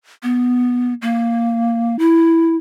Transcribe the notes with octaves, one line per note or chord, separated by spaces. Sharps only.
B3
A#3
E4